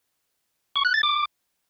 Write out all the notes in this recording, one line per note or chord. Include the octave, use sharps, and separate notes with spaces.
C#6
F#6
A6
D6